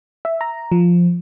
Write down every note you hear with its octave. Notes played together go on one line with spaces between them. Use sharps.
E5
A#5
F3